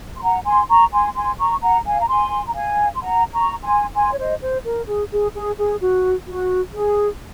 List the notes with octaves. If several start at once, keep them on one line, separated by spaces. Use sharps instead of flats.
C6
F#5 A#5
G#5 C6
A#5 C#6
G#5 C6
G#5 C6
A#5 C#6
F#5 A#5
F5 G#5
A#5
G#5 C6
A#5
F5 G#5
C6
F#5 A#5
A#5 C#6
G#5 C6
G#5 C6
C#5
C5 D#5
C5
A#4
G#4
G#4
G#4
G#4
F#4
F#4
G#4